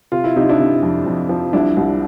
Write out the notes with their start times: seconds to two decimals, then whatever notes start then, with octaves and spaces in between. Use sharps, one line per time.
0.12 C3 F4
0.24 E4
0.36 C3 D#4
0.49 D4 E4
0.59 C3
0.83 F2
1.06 F2
1.29 F3
1.53 C2 D4 E4
1.77 C2